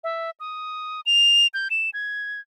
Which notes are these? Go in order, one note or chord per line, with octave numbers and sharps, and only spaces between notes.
E5
D#6
F7
G6
E7
G#6